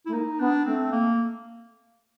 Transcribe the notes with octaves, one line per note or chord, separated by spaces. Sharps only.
A3 E4
A#3 D#4
B3 D4
A3 C4
A#3